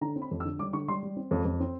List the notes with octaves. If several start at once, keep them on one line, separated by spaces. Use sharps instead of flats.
D3 A#5
C4
B5
F2
E6
D3
G3 D6
D3 C#6
G3 C6
G3
C4
F2
F2
C4